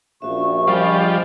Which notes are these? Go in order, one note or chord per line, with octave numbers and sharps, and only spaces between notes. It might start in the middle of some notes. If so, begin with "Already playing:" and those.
A#1 C#4 F#4 E5 C#6
F3 G3 D#5 G#5 B5